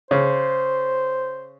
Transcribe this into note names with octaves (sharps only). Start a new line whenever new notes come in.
C#3 C5